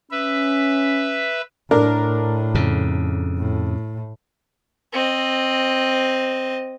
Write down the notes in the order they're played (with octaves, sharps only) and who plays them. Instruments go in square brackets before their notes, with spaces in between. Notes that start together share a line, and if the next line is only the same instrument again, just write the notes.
[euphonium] C#4 [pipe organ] B4 E5
[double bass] A2 [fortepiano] D4 A#4
[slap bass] F2 C#3
[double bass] A2
[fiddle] C4 D#5